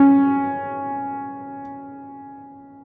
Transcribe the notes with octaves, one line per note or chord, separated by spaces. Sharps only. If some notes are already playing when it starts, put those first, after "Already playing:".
Already playing: C#4